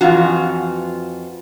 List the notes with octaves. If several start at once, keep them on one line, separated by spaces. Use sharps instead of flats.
F2 G#2 E3 F4 F#4